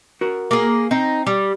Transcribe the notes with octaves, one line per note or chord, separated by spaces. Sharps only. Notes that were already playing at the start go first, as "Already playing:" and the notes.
F#4 A#4
A#3 G#4
C4 D#4
G3 D5